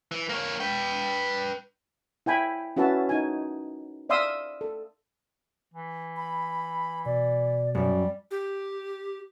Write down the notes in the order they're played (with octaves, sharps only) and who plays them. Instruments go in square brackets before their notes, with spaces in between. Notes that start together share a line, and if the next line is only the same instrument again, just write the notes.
[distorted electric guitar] E3
A#3 C#5
B4 G5
[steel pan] E4 G5 G#5 B5
C#4 E4 F#4 B4 E5 A5
D#4 G#5
D5 E5 F5 C6 D#6 E6
A4
[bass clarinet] E3
[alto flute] B5
[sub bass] B2 [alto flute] D5
[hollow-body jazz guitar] F#2 [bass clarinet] G3 [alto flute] D5
[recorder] G4